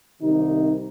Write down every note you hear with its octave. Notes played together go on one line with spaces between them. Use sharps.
C2 C3 D#3 D#4